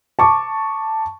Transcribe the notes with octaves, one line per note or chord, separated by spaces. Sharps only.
A5 C#6 D6